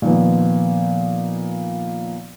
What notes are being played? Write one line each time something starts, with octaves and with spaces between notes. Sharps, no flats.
A#2 D#3 F3 B3